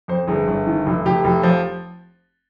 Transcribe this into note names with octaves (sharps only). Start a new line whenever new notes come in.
F2 C5
G1 G#4
G1
D#3
F1
F1 G4
F1
F3